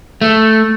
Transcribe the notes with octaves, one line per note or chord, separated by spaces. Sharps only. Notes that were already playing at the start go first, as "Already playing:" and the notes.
A3